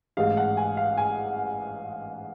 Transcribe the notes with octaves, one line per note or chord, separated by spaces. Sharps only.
A1 G#2 G#3 F5
F#5
G#5
F5
G#5